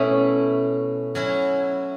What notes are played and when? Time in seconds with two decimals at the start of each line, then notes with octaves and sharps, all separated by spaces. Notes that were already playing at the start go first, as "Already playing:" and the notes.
Already playing: B2 A3 C#4 E4
1.15 F#3 C#4 E4